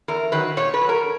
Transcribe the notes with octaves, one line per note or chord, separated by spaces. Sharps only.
E2 A#4
D#3 F#3 B4
A#2 C#5
B4
F#3
A#4